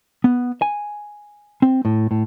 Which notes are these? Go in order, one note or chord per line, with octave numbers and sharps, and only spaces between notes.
B3
G#5
C4
A2
A2